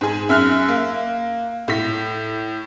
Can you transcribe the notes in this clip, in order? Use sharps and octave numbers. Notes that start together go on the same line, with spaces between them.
G#2 G#4
F#2 E5 F6 F#6
A#3
A2 B6